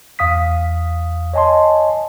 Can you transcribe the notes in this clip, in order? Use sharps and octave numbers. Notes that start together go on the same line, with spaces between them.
E2 F5 D#6 B6
C#5 D#5 G#5 A5 C6